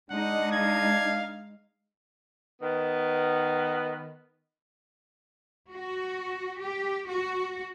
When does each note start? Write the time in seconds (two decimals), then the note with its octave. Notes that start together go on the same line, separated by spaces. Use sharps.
0.11 G#3 D4 D#4 F#5
0.52 F5 G#6
2.61 D#3 B3
5.72 F#4
6.60 G4
7.08 F#4